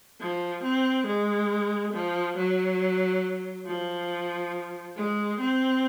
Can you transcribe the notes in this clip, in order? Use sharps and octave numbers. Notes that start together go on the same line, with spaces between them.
F3
C4
G#3
F3
F#3
F3
G#3
C4